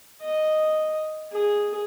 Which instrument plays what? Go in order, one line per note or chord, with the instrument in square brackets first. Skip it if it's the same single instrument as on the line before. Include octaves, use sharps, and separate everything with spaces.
[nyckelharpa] D#5
G#4